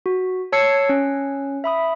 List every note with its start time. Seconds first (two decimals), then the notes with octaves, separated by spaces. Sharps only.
0.06 F#4
0.52 C#5 A5 E6 G#6 C7 C#7
0.89 C#4
1.64 E5 B5 D#6